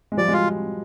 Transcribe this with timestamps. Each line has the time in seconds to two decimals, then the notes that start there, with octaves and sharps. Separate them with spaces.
0.12 G#3
0.17 F3 G3 D5
0.28 F#3 G#3 F4